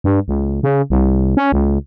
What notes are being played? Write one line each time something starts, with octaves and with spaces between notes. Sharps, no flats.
G2
C#2
C#3
C2
C#4
C#2